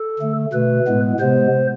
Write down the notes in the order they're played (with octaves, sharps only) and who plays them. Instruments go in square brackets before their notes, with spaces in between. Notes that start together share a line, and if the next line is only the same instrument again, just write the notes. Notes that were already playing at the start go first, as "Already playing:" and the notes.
Already playing: [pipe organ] A4
D3 A3
B2 A3 B4
A2 G#3 B3
C3 G#3 B3 C5